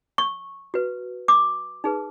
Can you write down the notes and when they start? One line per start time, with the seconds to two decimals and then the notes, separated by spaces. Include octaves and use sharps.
0.18 C#6
0.74 F#4 B4
1.28 D6
1.84 D#4 G#4 B4